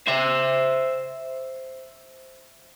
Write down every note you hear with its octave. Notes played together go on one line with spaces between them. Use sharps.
C5 E5